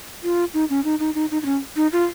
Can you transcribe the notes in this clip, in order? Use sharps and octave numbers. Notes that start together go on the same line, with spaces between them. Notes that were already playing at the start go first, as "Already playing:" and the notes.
F4
D#4
C#4
D#4
D#4
D#4
D#4
D#4
C#4
D#4
F4